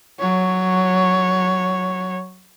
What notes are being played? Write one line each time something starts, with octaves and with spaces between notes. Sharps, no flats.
F#3 C#5